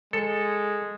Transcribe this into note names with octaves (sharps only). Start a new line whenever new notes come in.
G#3 A4